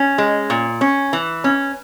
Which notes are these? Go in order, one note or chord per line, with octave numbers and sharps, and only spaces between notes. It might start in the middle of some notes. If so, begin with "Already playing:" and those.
Already playing: C#4
G#3
A#2
C#4
E3
C#4